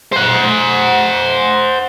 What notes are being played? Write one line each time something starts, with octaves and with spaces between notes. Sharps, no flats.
C5 F#5